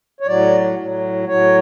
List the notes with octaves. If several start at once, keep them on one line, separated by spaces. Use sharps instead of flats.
C#5
A2 F#3 D5
A2 F#3
A2 F#3 C#5